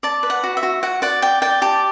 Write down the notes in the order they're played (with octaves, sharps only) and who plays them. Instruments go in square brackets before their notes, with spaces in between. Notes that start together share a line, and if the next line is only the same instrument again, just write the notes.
[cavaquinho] D5 A5
B4
F#5
F#4
E5
F#4
F#4 F#5
D5 F#5
D5 G5
D5 G5
G4 A5